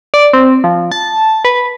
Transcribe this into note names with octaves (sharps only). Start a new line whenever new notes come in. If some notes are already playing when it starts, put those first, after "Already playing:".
D5
C4
F3
A5
B4